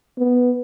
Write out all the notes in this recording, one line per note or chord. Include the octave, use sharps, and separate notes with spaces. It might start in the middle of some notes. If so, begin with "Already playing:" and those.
B3